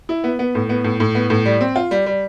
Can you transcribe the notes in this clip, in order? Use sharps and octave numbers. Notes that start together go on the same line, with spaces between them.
E4
B3
B3
A2
B3
A2
A2
B3
A2
G3
C4
F4
G3
G3